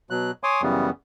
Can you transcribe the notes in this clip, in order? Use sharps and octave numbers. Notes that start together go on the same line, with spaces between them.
B2 F#3 F#6
C#5 G#5 C6 D6 D#6
F#2 C#3 E3 G3 B3